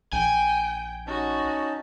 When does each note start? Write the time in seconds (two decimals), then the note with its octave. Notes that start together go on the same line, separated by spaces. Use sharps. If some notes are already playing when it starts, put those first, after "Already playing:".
0.13 A#1 G5 G#5
1.07 C#4 D#4 F#4 A5